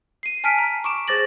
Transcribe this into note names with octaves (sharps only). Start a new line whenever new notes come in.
C7 D#7
G#5 A5 F6 B6 D7 D#7
A#5
C#6 D6 D7 E7
G#4 C5 D6 A6 A#6 F#7